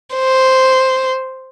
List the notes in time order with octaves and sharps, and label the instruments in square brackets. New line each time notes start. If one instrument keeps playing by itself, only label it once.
[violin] C5